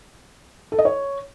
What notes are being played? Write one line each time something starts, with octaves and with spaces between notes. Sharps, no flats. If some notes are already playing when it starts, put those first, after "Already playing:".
A4
D#5
C#5